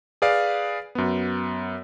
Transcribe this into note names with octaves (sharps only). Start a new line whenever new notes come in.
G#4 B4 D5 F5
F#2 B3